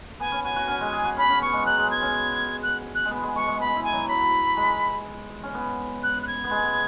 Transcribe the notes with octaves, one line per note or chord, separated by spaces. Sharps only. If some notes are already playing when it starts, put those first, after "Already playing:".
B3 G#5
C#4
F#4 G#5
F#4
C#4
G#3
G#4
F#4
C#4 B5
C#4
B3 C#6
G#3
F#3 F#6
G#3
B3 G#6
C#4
F#6
F#6
G#3
B3
G#3
G#3 C#6
G#3
B3 B5
E4
G#5
F#3
F#3 B5
G#3
C#4
B3
F#6
F#6
G#6
B3
G#3
B3